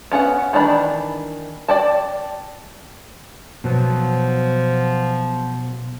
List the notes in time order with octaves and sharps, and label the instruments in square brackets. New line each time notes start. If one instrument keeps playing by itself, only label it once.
[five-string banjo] B3 C#4 C#5 F#5
D#3 E3 D4 A#5 B5
D5 G5 A5
[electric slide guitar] B2 F#3 B3 [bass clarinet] F3